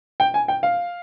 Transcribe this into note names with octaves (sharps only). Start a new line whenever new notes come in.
G5
G#5
G5
F5